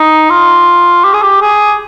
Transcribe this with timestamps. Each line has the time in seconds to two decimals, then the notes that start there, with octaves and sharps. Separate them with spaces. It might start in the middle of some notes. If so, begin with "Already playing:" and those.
Already playing: D#4
0.30 F4
1.04 G4
1.14 G#4
1.22 G4
1.41 G#4